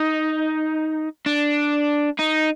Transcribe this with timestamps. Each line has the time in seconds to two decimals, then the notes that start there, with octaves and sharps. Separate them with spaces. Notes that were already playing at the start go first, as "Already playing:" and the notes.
Already playing: D#4
1.26 D4
2.19 D#4